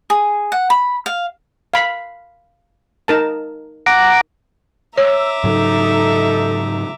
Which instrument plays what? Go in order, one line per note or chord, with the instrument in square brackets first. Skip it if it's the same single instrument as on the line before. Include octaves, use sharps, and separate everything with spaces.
[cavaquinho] G#4
F#5
B5
F5
[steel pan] F5 B5
D#4 A#4 A5
[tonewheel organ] F#5 A#5 D6
[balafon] C#5 [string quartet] E5 A#5 D6 [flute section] E6
[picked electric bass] G#2 C#3 F#3 [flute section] D#4 A4